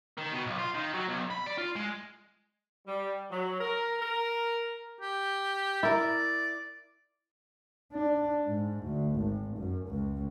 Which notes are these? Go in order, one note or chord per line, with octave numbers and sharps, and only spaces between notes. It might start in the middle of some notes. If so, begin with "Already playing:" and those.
D#3
B2
B1
F4
D#3
F#3
B1
B5
D5
F4
G#3
G3
F#3
A#4
A#4
G4
E4 A#4 D5
D4
G#2
D2
G#1
F#2
C#2